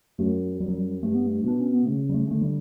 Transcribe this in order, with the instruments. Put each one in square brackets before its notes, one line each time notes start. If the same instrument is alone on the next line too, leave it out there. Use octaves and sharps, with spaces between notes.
[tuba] F#2 [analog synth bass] A3
[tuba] F#2 [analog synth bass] G3
[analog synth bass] F#3
G3
[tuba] G2 [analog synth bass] A3
[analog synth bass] B3
A3
[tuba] B2 [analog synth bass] D4
[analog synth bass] C#4
B3
[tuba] C#3 [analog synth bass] A3
[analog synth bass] G3
A3
[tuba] D3 [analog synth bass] A3
[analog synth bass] G3